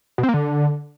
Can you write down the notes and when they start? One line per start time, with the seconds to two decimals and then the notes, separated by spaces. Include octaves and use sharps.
0.18 B2
0.23 C4
0.29 A#3
0.34 D3